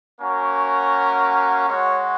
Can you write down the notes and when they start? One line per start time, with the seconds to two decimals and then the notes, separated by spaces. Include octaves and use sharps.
0.20 A#3 C#4 F#4 A#4
1.69 G#3 F#4 C#5